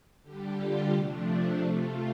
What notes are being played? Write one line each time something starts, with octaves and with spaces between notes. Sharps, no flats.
D3 G3 G4
F4
C3 F3 A3 D4
C3 A3 F4